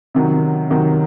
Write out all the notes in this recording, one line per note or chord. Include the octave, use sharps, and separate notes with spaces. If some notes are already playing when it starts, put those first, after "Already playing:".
C3 D#3 F#3
C3 D#3 F#3